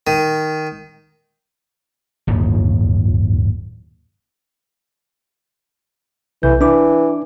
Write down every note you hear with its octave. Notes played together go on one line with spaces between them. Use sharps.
D#3
D1 G1 D#2
B1 C3 E3 G6
E3 D4 D6